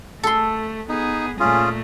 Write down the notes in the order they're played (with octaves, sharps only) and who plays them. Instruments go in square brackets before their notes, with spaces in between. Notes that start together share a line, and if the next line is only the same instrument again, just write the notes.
[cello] A3 [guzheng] A4 C6
[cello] B3 G#4 [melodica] D#4
[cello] A#2 A3 [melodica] C#4 F4 G#4